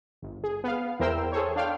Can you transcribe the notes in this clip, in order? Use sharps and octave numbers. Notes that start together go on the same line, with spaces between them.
G1
G#4
B3 F5
E2 E4 A#4 C5 G5 E6
G#4 A4 C5 C#5
D4 F5 G5 C6